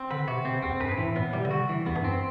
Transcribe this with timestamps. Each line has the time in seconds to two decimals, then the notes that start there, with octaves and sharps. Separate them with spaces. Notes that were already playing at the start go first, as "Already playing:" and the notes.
Already playing: C4
0.11 D3 B4
0.28 C3 F#4
0.45 C3 C4
0.62 E2 C4
0.80 F#2 B4
0.91 G2
0.98 A2 E3
1.16 A2 B3
1.33 C3 G3
1.45 D3
1.51 C3 F#4
1.69 E3
1.86 E2 B3
1.96 G2
2.04 F#2 C4